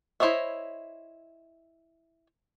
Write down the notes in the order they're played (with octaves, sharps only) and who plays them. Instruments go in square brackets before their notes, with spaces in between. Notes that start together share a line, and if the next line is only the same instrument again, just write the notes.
[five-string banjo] E4 C5 C#5 D#5 E5